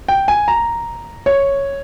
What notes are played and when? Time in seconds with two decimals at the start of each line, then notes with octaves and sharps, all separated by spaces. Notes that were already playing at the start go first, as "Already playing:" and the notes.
0.08 G5
0.28 G#5
0.48 A#5
1.26 C#5